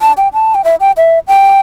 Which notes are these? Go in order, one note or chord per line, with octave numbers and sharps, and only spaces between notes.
A5
G5
A5
G5
E5
G5
E5
G5